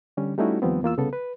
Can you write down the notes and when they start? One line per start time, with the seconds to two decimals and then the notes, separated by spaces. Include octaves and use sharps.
0.17 D3 G3 C#4
0.38 G3 A3 C#4 D#4 E4 F#4
0.62 D#2 F3 G3 B3 C4
0.83 E2 A#3 F4 E6
0.97 C2 C#3 B3 A4
1.13 B4